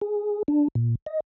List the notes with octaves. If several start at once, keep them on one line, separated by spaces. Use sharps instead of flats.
G#4
D4
A#2
D#5